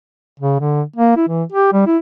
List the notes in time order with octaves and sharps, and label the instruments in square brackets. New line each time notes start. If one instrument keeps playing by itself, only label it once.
[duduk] C#3
D3
A#3
E4
E3
G4
G3
E4